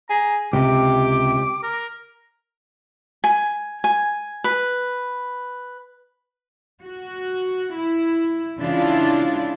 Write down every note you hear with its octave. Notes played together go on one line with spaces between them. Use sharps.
G#4 A#5
C#2 C3 G4 D6
A#4
G#5
G#5
B4
F#4
E4
C#3 E3 G#3 D4 E4 F4